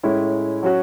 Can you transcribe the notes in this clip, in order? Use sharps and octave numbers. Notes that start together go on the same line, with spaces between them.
A2 G#3 C#4 E4
F#3 C#4 F#4